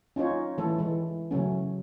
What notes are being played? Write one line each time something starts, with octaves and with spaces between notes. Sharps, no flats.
C#4 D#4 F4 C#5
E3 A3 A4
E3 G#3
C#3 F#3 A3 C#4